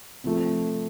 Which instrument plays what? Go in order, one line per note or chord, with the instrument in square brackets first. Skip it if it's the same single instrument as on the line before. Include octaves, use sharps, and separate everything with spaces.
[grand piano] C3 F3 A3